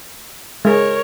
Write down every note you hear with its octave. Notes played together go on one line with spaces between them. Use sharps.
G#3 G#4 A#4 C#5